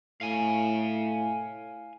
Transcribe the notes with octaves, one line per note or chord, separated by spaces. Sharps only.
A2 F5 G#5